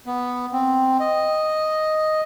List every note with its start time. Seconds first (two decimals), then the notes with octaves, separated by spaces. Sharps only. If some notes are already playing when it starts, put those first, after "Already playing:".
0.06 B3
0.53 C4
1.00 D#5